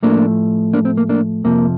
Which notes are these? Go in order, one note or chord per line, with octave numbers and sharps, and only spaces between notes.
A2 F3 A3 A#3 D4
A#3 D4
C4
A#3
A#3 D4
F2 C3 F3 A#3